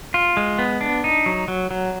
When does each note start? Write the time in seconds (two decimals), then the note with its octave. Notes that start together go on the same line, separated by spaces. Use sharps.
0.14 F4
0.37 G#3
0.59 B3
0.81 D4
1.04 D#4
1.26 F#3
1.48 F#3
1.71 F#3